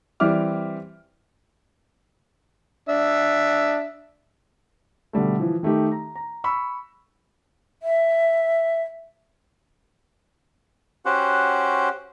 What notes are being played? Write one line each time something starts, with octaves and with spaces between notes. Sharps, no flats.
E3 G3 C4 E5 D6 F6
D4 E5
B2 D3 G3 A3
E3 F3
D#3 A3 D#4 G4
A#5
A#5
B5 C#6 E6
E5
C#4 F#4 G4 C5 F#5